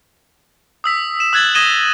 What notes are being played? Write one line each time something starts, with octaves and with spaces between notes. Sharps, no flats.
D#6 E6 B6
E7
E6 F#6 G#6 A6 F#7
D#6 G#6 A#6 D#7 E7 G7